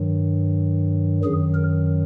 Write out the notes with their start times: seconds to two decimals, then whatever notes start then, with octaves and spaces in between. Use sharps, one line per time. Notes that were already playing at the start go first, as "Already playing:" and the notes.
Already playing: G2 D#3 F#3
1.24 F#2 D#3 F#3 G#4
1.54 A#4